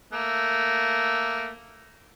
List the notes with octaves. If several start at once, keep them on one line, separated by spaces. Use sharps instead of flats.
A3 A#3